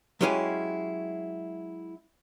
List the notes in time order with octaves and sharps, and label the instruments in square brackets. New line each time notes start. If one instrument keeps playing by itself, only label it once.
[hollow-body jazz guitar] F#3 G#3 C#4 E4 G4 G#5